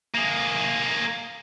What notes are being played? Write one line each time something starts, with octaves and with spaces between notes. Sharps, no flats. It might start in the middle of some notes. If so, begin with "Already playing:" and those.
A#3 G#4